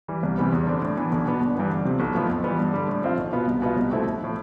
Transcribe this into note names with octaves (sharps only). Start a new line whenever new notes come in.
E3 G3
C2
C3 E3 G3 B3
E2
D3 G3 C4
A2
E3 B3 D4
B1
B2 B3 D4
G1
G2 E3 B3
D2
C3 F3
B1
A2 F3 B3
F2
E3 G3 B3
G2
D3 G3
A2
F3 C4 F4
B1
B2 B3 F4
C2
B2 B3 F4
C2
B2 A3 C4 E4
B1
A2 F3